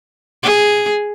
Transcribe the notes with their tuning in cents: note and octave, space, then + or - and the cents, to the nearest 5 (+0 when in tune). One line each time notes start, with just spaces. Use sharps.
G#4 +0